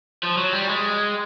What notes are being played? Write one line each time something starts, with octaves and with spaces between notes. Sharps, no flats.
F3
F#3
G3
G#3